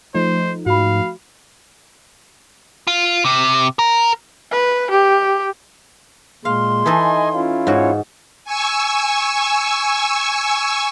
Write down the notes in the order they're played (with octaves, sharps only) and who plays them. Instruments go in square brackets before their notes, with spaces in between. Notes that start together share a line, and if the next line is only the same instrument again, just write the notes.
[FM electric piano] F3 A3 D#4 [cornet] C5
[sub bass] G#2 [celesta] F#4 B5 [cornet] F5
[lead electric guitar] F4
C3
A#4
[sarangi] B4
G4
[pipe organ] A#2 G#3 [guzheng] F5 [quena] C6
[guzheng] E3 D#4 A4 [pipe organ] D#5 G#5
[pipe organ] C#4 E4 F4
[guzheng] G#2 F#4 [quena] C#5
[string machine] G#5 C#6 E6